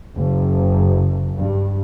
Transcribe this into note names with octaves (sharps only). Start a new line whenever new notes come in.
F#1
G2